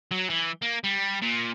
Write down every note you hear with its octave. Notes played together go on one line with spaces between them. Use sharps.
F#3
E3
A#3
G3
A#2